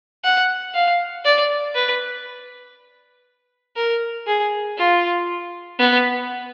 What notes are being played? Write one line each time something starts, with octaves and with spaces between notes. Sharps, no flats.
F#5
F5
D5
B4
A#4
G#4
F4
B3